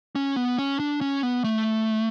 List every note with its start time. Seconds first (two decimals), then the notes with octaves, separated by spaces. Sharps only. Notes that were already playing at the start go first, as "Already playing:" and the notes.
0.15 C#4
0.36 B3
0.58 C#4
0.80 D4
1.01 C#4
1.23 B3
1.44 A3